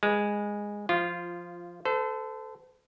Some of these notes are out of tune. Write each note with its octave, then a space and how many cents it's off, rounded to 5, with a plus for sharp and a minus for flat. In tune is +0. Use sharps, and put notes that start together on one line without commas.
G#3 -10 B4 +0
F3 +0 F4 -15
A4 +0 C5 -40